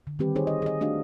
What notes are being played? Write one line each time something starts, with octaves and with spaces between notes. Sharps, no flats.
D3
D#3 G3 C4 G4 B4
D#4 G#4 C5 C#5
D#5
G#4 D#5
A3 D4 F#4 D#5 F5